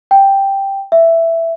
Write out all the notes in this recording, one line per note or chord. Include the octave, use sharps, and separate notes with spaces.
G5
E5